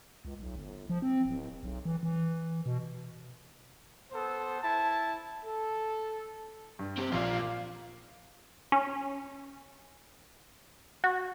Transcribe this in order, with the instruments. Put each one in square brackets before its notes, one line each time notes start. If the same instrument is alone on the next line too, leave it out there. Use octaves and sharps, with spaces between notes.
[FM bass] C#2
B1
G1
F3
C4
D1
B1
E3
E3
B2
[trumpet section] B3 A4 C5
E4 A5
A4
[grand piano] G2
[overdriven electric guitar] C4 G4
[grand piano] A#1 [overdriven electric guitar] F4 D5 [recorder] F5
[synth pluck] C#4
F#4